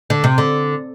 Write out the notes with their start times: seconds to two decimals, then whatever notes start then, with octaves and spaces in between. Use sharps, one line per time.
0.10 D3
0.24 C3
0.38 D3